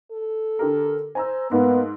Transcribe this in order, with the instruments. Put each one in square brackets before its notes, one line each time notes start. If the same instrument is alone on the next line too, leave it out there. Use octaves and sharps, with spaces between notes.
[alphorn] A4
[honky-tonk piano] D3 G4 A#4
[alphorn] C5 [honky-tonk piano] G#5 A#5 E6
[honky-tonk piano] G#2 [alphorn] A#3 [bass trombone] B3